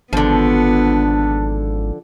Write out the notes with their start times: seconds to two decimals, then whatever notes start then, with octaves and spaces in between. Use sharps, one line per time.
0.13 G#1 D3 F3 B3 D4